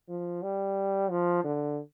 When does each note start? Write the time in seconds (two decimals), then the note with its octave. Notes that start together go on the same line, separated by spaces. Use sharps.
0.09 F3
0.43 G3
1.11 F3
1.44 D3